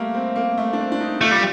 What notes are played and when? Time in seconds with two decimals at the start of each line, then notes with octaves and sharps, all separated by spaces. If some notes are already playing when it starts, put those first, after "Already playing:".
Already playing: G3 A3 A#3
0.14 C4
0.36 A#3
0.57 A3
0.73 D4
0.79 C4
0.92 D4
1.01 D#4
1.21 A3 F4
1.32 G3